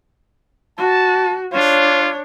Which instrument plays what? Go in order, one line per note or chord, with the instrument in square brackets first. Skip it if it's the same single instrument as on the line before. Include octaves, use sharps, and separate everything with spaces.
[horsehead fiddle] F#4 [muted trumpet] A5
[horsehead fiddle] D4 C#5 [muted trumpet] F4